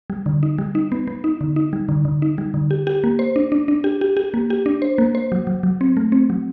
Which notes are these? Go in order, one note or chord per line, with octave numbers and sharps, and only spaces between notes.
G3
D3
D#4
G3
D#4
B3
B3
D#4
D3
D#4
G3
D3
D3
D#4
G3
D3
G4
G4
A#3
C5
D4
D4
D4
G4
G4
G4
A#3
G4
D4
C5
A#3
C5
F#3
F#3
F#3
C4
A3
C4
F#3